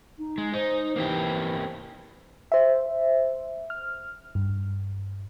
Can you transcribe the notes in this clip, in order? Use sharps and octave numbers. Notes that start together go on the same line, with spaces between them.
D#4
G#3
D#4 C5
E3 A#3 C4 G4
C5 E5
F6
G2